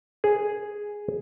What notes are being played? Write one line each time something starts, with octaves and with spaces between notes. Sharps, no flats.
G#4